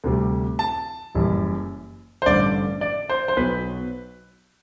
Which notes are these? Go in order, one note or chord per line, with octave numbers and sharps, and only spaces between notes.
D2 C3 G3
A5
F#1 F#2 E3 G3
C5
A1 G2 D3 D5
D5
C5
C5
B1 B2 F#3 B4